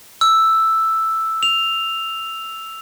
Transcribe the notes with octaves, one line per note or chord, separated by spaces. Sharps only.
E6
F7